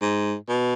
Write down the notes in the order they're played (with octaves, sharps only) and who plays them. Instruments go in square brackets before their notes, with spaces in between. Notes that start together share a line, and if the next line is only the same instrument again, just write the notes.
[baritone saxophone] G#2
B2